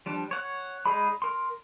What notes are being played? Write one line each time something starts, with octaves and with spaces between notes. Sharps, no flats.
F3 G3 D4
C#5 F#5 F#6
G#3 D#4 G#4 D5 B5
A#4 C6